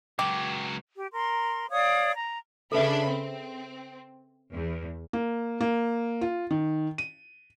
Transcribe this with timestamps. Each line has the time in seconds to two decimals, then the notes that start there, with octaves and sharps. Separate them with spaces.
0.19 C#2 F#3 G4
0.96 G4
1.13 A#4 C6
1.71 C#5 D5 F5 D#6
2.14 A#5
2.72 C#3 D4 A4 B4 E5 B5
3.07 C4
4.53 E2
5.13 A#3
5.61 A#3
6.21 F4
6.50 D#3
6.98 D#7